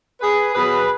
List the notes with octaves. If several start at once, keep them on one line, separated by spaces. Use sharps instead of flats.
G#4 B4
B2 F#3 G#4 B4